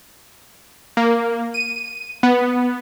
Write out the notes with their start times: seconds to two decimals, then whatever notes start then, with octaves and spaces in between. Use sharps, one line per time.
0.97 A#3
1.54 D#7
2.23 B3